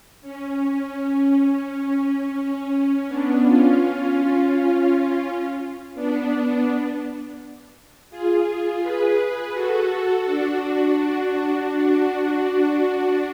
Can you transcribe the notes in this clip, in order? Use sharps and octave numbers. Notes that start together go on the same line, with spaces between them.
C#4
B3 D4
C#4 F4
B3 D4
F4 G#4
G#4 B4
F#4 A4
D4 F#4
D4 F#4